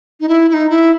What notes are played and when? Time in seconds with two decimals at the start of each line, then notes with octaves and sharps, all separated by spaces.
0.21 D#4
0.29 E4
0.49 E4
0.54 D#4
0.70 E4